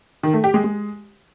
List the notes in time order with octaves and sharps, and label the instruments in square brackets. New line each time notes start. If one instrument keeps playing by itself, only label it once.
[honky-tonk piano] D#3
A3
G4
G#3
G#3